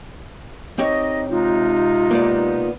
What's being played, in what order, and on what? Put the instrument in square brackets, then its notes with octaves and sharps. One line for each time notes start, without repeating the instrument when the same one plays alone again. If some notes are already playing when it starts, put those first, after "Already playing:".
[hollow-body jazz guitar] C4 G4 C#5 [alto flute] D#4 [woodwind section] D#5
[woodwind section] C3 G#3 D#4 [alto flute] F4
[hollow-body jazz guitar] A#3 B3 D5